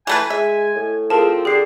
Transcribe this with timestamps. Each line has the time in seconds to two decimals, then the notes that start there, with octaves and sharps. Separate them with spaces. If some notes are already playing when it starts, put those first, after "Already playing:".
0.07 E3 A3 B4 G#5
0.30 G#3 E5
0.76 A2
1.10 F3 C4 G#4 A#4 A5
1.45 D3 G4 G#4 C7